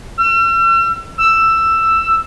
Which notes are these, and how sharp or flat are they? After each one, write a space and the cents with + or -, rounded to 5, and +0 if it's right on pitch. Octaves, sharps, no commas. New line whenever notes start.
E6 +45
E6 +10